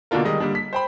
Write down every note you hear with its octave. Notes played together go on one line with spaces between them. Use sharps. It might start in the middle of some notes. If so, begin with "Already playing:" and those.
B2 D3 A#3 D4 F4 A#4
D#3 G3 G#3 D#5
D3 G3 A#3 D4
B6
C5 G5 B5